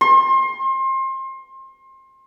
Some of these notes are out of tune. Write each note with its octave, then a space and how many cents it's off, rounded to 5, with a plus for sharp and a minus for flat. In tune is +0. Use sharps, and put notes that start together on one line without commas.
C6 +30